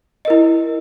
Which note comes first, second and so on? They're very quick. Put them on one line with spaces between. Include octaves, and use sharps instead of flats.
D#5 A#4 E4